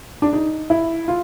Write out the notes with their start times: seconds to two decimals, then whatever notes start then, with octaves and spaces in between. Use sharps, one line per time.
0.22 D4
0.33 D#4
0.70 E4
1.08 F4